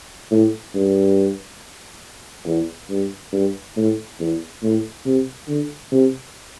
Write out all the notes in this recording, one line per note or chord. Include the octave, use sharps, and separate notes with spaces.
A2
G2
E2
G2
G2
A2
E2
A2
C3
D3
C3